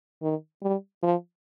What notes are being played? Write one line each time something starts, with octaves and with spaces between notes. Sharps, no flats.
D#3
G3
F3